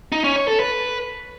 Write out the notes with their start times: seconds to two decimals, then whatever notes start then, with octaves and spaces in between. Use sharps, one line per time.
0.12 D#4
0.24 C#4
0.36 C#5
0.48 A4
0.60 B4